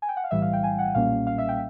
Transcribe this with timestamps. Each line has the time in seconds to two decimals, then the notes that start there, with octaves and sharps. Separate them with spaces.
0.02 G#5
0.08 G5
0.16 F#5
0.24 F5
0.31 B1 A2 E3 G3 E5
0.42 F5
0.53 G5
0.63 G#5
0.79 F#5
0.95 B1 A#2 G3 A#3 C#4 F5
1.27 F5
1.38 E5
1.48 G5